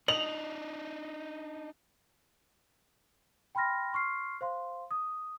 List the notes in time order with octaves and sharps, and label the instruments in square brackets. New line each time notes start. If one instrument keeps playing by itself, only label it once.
[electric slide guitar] D4 D#4 [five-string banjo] D#5 [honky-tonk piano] F7 [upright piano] F#7
[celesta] G5 B5 C6 F6 A#6
C6 C#6 F6 C7
C5 F5 C6
D#6